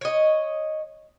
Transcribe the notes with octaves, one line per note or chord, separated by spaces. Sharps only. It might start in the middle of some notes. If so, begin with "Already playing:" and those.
C#5 D#5